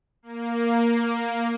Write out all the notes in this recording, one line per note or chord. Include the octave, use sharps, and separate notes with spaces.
A#3